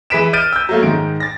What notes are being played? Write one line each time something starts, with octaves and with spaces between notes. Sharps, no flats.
E3 G#4 B4 B6 D7 E7
F6 G6 A6 D7 D#7
E6 G6
F#3 A3 A#3
G#2 D#3 D7
A6 A#6